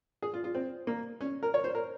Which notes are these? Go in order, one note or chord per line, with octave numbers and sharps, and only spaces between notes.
G#4
F4
F4
C4
A#3
C#4
A#4
C#5
C5
A#4